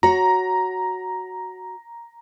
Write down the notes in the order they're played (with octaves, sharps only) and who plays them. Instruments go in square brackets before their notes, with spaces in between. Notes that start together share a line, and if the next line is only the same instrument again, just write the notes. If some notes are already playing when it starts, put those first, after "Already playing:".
[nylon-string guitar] F#4 C#5 [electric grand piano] A#5